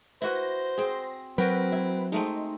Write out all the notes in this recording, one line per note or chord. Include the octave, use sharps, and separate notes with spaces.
E4 F#4 B4 C5 A#6
C4 G#4
F#3 C4 F#4 A#4 B4 G5
E4
G#3 A3 C4 D#4